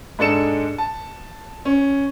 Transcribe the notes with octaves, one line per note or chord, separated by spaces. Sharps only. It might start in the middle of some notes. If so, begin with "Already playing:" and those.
G#2 G#3 D4 A4 C#7 E7
A5
C#4